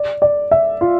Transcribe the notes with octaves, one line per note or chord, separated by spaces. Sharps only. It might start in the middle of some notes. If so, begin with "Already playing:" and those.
Already playing: D5
D5
E5
F4